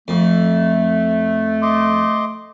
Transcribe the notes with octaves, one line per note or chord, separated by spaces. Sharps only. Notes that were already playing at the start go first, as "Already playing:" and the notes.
F2 A3
D#5 C6 D6